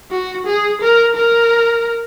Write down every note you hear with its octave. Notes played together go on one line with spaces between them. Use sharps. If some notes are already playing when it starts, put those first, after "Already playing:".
F#4
G#4
A#4
A#4